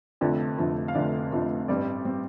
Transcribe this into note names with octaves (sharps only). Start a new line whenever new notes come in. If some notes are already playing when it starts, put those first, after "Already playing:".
F1 F2 D3 F3 A3 D5
F1 F2 D3 F3 A3
F5
F1 F2 D3 F3 A3 D5
F1 F2 D3 F3 A3
A1 G2 G3 C4 D5
G3 C4